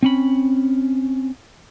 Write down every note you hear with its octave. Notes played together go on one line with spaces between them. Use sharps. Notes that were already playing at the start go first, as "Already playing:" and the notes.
C4 C#4 B5